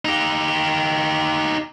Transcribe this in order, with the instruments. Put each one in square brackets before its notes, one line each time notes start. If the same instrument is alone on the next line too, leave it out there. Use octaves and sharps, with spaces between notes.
[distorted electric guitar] D#4 G4